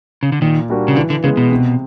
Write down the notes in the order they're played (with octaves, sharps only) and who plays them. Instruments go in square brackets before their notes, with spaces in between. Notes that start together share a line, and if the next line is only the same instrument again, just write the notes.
[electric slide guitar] C#3
D3
[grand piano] A#2 [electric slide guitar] D#3
[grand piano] G3 A#3 D4 F#4
[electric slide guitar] C#3
[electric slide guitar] D3 [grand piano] E3
[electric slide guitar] D3
[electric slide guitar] C#3 [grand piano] G#3 B3
[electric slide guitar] B2
[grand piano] C3